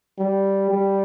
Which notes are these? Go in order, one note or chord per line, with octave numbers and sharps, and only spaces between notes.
G3
G3